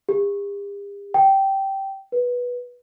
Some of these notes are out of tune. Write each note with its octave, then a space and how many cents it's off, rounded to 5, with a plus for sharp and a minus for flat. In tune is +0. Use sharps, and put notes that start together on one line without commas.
G4 +45
G5 -15
B4 -10